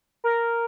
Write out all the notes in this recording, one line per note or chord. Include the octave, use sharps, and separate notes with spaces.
A#4